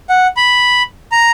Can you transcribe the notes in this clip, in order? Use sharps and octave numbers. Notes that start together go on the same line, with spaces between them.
F#5
B5
A#5